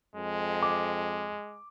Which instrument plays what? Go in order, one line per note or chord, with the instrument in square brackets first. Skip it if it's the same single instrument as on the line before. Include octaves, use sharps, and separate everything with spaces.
[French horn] F2 [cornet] G#3
[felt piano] D6